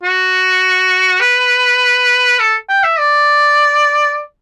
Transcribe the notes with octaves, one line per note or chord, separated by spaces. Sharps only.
F#4
B4
A4
G5
E5
D5